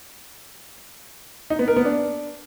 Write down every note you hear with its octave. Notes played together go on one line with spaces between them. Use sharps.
D#4
B3
A#4
B3
D4